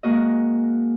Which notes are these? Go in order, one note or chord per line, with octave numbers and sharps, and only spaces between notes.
G#3 A#3 F#4 D#5